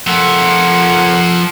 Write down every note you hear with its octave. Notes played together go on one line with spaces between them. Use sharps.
F2 F3 A#4 E5 F#5